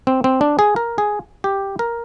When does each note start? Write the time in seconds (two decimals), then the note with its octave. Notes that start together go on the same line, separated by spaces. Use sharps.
0.07 C4
0.24 C4
0.41 D4
0.59 G#4
0.76 A#4
0.98 G#4
1.44 G4
1.79 A#4